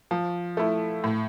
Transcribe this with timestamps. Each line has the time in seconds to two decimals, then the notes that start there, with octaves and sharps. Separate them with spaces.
0.11 F3
0.57 A3 E4
1.04 A2